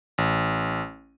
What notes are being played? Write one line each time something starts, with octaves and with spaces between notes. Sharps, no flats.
A1